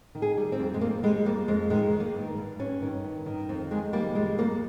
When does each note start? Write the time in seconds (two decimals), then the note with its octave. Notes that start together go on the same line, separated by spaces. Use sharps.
0.15 D#3
0.22 G#4
0.37 G3
0.52 C4
0.59 F2
0.74 G#3
0.81 D#3 A#3
1.03 G3 G#3
1.25 F2 A#3
1.48 F2 G#3
1.70 D#3 G#3
1.93 D#3
2.00 A#3
2.15 G2
2.38 G2
2.59 G2 C#4
2.82 D#3
3.04 G2
3.26 D#3
3.49 F2 C4
3.71 D#3 G#3
3.93 G3 A#3
4.15 F2 G#3
4.38 F2 A#3